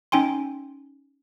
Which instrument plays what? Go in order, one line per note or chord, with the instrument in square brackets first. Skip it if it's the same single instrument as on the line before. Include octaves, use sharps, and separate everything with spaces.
[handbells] C#4 D#4 G5 G#5 C6